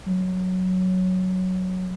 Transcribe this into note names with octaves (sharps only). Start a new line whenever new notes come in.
F#3